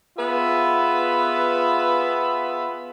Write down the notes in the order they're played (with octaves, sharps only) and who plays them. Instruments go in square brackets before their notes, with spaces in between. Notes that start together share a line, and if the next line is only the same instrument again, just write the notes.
[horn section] B3 F4 G#4 B4 E5